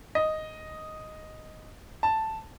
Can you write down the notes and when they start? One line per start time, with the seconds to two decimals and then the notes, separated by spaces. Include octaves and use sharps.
0.15 D#5
2.03 A5